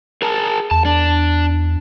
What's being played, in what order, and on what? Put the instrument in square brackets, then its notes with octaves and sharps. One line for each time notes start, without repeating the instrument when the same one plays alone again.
[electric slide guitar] G#4 A#4 A5
[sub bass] E2 [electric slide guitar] A5
[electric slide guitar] D4